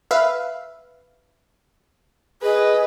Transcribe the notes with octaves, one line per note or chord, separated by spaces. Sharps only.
B4 E5 F5
G#4 B4 D#5